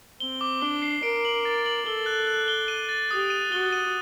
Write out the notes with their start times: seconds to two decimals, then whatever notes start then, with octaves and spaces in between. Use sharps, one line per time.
0.20 C4 G7
0.41 D6
0.61 D4 G7
0.82 C7
1.03 A#4 D7
1.25 F#7
1.45 A6
1.66 F#7
1.86 A4 G7
2.06 F#6
2.27 F#6
2.48 G7
2.68 D#7
2.89 A6
3.11 G4 D#6
3.30 D#7
3.52 F#4 G7
3.72 D#7